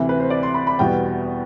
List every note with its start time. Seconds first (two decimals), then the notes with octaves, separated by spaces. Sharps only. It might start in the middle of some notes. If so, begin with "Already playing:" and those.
Already playing: D2 C3 E3
0.09 B4
0.20 C5
0.30 D5
0.43 C6
0.54 B5
0.67 B5
0.79 E2 B2 G3 B3 G5